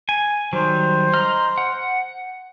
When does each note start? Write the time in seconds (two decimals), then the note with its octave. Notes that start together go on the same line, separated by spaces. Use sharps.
0.09 G#5
0.53 D#3 F#3 G3 C5
1.13 D#5 A#5 F6
1.58 F#5